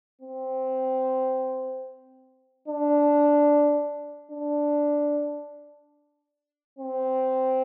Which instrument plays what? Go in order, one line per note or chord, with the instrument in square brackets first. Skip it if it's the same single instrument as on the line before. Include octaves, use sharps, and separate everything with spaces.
[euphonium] C4
D4
D4
C4